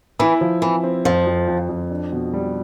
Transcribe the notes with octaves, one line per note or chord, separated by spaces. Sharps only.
E3 E4
F3
E3 C4
C4
F2 F3
F2
F2
F2
D4
B2
G3